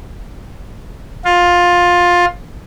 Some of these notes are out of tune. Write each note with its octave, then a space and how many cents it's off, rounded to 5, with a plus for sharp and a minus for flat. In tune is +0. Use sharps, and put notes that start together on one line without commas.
F4 +15